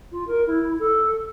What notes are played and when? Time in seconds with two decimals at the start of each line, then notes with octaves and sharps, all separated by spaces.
0.12 F4
0.27 A#4
0.47 E4
0.79 A4